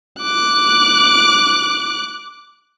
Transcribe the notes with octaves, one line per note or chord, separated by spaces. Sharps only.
D6 F#6